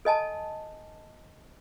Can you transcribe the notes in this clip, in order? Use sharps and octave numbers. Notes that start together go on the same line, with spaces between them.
A4 D#5 G#5 A5